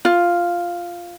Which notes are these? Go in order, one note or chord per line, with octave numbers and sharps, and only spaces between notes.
F4